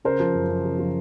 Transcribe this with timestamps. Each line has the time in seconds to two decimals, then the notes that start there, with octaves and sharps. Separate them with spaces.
0.05 C#3 A#4 C5
0.20 F3
0.34 F#2
0.49 F#2
0.64 C#3
0.79 F3